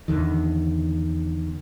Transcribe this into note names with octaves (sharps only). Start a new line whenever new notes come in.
E2 D3 D#3